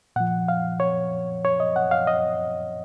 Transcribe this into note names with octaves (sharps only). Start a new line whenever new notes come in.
A#2 F3 F#5
F5
C#5
C#5
D#5
F#5
F5
D#5